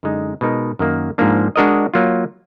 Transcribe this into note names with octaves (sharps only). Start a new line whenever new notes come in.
F#2 D3 G#3 D#4
B2 G#3 D#4 A#4
F#2 D#3 A#3
G#2 F3 A#3 D4
G#3 D4 F#4 A#4 D#5
F#3 A#3 F4